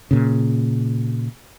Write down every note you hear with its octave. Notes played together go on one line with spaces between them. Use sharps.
A#2 C#3